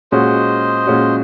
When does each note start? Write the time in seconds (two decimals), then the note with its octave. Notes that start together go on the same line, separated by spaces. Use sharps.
0.12 A#2 G#3 C#4 F#4 C5 D#5
0.87 A#2 G#3 C#4 F#4